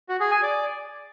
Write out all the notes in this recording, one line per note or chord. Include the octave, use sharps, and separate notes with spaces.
F#4
G#4
G#5
D5